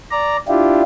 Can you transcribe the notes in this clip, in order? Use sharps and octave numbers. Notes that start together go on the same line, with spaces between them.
D5 A#5
D4 E4 F4 G4